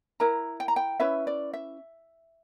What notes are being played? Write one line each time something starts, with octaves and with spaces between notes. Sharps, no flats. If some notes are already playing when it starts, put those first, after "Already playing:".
E4 A#4 A#5
G5
A#5
G5
C#4 E4 B4 E5
D5
E5